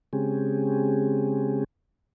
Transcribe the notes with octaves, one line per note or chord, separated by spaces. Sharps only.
C#3 G#3 C4 C#4 G4 G#4